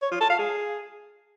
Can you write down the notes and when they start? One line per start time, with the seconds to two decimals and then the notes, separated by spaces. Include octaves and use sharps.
0.02 C#5
0.11 F4
0.21 A5
0.30 F5
0.39 G#4